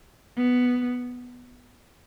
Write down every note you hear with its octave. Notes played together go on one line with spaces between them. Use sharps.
B3